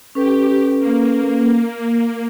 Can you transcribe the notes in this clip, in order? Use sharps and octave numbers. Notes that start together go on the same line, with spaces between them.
C#4 G4 A4 B4
A#3